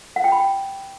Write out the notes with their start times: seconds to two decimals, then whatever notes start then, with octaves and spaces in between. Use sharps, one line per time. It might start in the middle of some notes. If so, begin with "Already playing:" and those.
0.16 F#5
0.24 G5
0.32 B5
0.40 G5